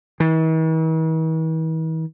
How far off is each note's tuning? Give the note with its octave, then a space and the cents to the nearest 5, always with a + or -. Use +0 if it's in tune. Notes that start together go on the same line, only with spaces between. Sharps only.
E3 -45